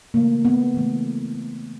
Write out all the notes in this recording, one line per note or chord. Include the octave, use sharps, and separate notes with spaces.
C#3 E3 A3 A#3
B3
C#3 E3 A3